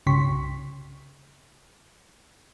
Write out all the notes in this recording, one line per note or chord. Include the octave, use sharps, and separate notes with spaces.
C2 G2 C#3 C6 C#6 B6